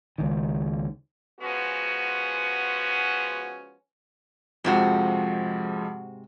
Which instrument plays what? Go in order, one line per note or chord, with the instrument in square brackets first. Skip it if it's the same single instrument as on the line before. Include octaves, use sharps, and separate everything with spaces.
[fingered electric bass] C#2 D#3
[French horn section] F3 G#3 B3 C#4 F#4
[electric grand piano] F2 F3 G#3 [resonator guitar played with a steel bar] G#2 C3 F#4